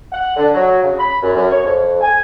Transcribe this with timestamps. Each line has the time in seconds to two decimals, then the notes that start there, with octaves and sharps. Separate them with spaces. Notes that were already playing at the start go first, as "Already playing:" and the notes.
0.13 F#5
0.37 D3
0.54 F#3
0.83 C#3
0.99 B5
1.22 F#2
1.36 F#2
1.52 C#5
1.64 F2
2.01 G#5